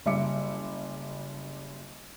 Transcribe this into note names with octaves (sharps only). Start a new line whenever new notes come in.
F#1 G3 E5 D6 C#7